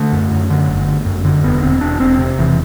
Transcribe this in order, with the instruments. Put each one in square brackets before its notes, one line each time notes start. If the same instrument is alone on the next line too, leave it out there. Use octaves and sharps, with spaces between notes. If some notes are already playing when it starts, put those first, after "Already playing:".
Already playing: [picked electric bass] D3 A3
F#2
F#2
D3
G1
G1
F#2
D3
E1 B3
E1 C4
E1 D4
E1 C4
C3
E1 E3